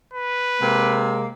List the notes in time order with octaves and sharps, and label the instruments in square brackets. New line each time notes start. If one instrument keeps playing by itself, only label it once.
[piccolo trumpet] B4
[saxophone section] C3 G#3 A#3